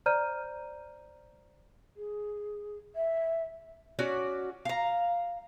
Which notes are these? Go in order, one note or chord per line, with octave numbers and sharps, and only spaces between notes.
C5 D5 A#5 F6 G6 D#7
G#4
E5
C#4 F#4 D5
F5 A#5